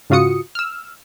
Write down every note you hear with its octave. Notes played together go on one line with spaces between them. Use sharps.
G#2 C#3 F4 F#4 D#6 C#7
E6 F6